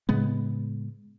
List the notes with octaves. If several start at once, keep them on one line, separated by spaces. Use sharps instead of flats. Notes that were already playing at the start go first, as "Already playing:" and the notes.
A2 C#3 G#3 B3